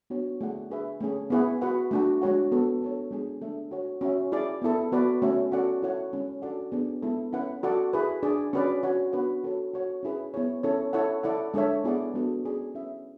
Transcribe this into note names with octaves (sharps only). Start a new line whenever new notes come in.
B3 D4 F#4 C#5
A3 E4 G#4 D5 F#5
D4 G#4 B4 E5
A3 C#4 G#4
B3 E4 G#4 B4 F#5
F#4 B4 F#5
A3 D4 F#4
G#3 D4 F#4 C#5 F#5
B3 F#4 A4
D4 A4 C#5
G#3 B3 D4 G#4
A3 D4 A4 E5
F#4 C#5 F#5
C#4 F#4 C#5 E5
E4 G#4 D5
B3 E4 A4
B3 F#4 B4 D5
A3 C#4 F#4 C#5 E5
C#4 F#4 A4 D5 F#5
E4 A4 C#5 F#5
G#3 C#4 E4
D4 F#4 A4 D5 F#5
B3 D4 G#4 D5
G#3 B3 E4 A4
C#4 E4 B4 F#5
F#4 A4 D5 F#5
E4 G#4 B4
D4 G#4 D5
C#4 F#4 B4 D5
F#4 C#5 F#5
B3 D4 F#4 B4 F#5
F#4 A4 C#5
F#4 C#5 F#5
C#4 E4 G#4 B4
B3 E4 G#4 C#5
C#4 E4 A4 C#5
E4 A4 C#5 F#5
E4 A4 D5 F#5
G#3 D4 A4 C#5 E5
B3 E4 G#4 D5 F#5
G#3 B3 D4 F#4 A4
C#4 G#4 D5
C#4 E4 B4 E5